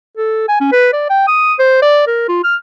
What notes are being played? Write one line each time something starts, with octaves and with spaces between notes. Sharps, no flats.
A4
G#5
C#4
B4
D5
G5
D#6
C5
D5
A#4
F4
F6